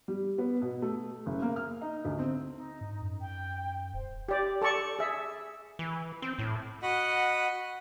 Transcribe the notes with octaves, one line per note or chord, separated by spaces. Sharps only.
G3
B3
B2
A3
F#1
A#3
F6
D#4
D2
C4
D#4
G#2
F#2
G5
D#1 C5
G4 D5
A4 D5 A5 C#6
G#4 E5
E3
C4
A2
F#4 D#5 F#5 B5